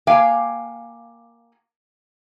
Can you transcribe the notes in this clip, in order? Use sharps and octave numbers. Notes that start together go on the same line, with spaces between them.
A#3 F5 G5 G#5